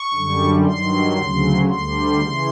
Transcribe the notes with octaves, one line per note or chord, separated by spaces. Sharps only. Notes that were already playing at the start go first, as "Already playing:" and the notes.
Already playing: C#6
F#2 D3 G3
G2 D#3 F#3 C6
D2 C#3 F#3
D2 D3 G3 C6
C#3 E3